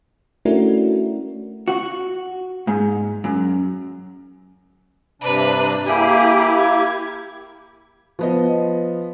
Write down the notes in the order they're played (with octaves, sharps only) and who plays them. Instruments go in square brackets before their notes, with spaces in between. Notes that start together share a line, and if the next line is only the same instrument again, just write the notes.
[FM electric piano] A3 C#4 D4 E4 F#4 A#4
[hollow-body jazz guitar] F#4
G#2
F#2
[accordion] G2 C3 D4 [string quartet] B4 A#5
[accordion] A#3 E4 G4 [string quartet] G#4 A#4
[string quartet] G#6
[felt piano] F3 B3 D#5